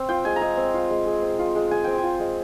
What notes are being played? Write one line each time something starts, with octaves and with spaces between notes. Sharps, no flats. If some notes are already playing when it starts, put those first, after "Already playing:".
Already playing: C4
F4 G5
G#3 G#5
A#5
G#3 G#5
C4
F4
G#3
G#3
C4
F4
G#3
G#3 G#5
C4 G5
G#5
F4
G#3